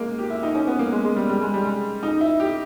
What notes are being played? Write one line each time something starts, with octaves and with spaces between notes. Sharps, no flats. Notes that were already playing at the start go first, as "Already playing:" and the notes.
Already playing: G#3 A#3
G4
E4
D#4
C#4
B3
A#3
G#3
G#3
G3
G3
G#3
G3
G#3
D#4
E4
G4